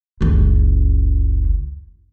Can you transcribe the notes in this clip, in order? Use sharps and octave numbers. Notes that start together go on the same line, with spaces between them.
F#1 C#2